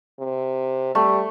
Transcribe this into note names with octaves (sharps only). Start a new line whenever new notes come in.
C3
G3 A3